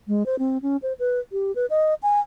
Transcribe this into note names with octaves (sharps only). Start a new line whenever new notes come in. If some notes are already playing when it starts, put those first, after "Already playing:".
G#3
C5
C4
C#4
C5
B4
G4
B4
D#5
G#5